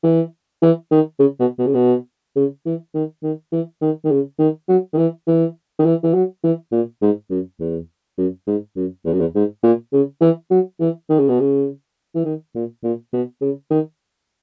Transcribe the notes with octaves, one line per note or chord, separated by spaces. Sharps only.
E3
E3
D#3
C#3
B2
B2
C#3
B2
C#3
E3
D#3
D#3
E3
D#3
D#3
C#3
D#3
F#3
D#3
E3
E3
D#3
E3
E3
F#3
E3
A#2
G#2
F#2
E2
F#2
G#2
F#2
E2
F#2
E2
G#2
A#2
C#3
E3
F#3
E3
D#3
C#3
B2
C#3
E3
D#3
A#2
A#2
B2
C#3
D#3